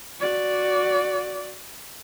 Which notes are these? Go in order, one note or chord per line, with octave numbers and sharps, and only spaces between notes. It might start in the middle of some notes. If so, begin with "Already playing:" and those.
F#4 D5